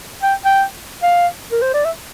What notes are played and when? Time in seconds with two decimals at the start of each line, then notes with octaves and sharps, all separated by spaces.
0.23 G5
0.45 G5
1.03 F5
1.52 A#4
1.62 C5
1.74 D5
1.85 E5